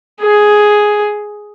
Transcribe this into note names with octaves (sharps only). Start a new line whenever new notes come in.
G#4